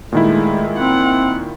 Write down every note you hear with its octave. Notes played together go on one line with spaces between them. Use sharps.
A#2 D#3 G#3 A3 E4
C4 F#5